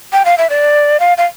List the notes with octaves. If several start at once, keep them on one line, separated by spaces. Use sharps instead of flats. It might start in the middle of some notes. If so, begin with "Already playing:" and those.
G5
F5
E5
D5
F5
F5